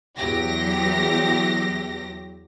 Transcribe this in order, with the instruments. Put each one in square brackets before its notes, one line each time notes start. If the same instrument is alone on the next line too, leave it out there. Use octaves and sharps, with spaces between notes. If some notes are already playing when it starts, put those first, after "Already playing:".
[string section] E2 F#3 G4 A#6